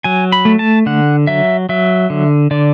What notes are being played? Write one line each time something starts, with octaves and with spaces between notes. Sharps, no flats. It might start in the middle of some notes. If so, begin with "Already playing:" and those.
F#3 G#5
B5
A3
A5
D3 F#5
F#3 E5
F#3 E5
D3
D3 D5